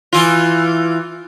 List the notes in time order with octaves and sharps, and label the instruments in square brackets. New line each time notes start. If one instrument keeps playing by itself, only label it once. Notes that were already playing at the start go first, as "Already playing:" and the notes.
[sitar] E3 F4